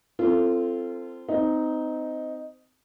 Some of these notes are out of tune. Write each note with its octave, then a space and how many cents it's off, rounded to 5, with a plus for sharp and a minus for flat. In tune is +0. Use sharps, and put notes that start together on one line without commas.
C4 +0 F4 -25 A4 +10
C4 -25 D#4 +0